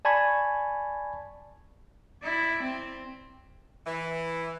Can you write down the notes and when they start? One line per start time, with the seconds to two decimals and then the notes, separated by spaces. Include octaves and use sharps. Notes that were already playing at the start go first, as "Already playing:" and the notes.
0.05 D5 G#5 A5 B5 C#6 G#6
2.23 E4 D5
2.64 C4
3.86 E3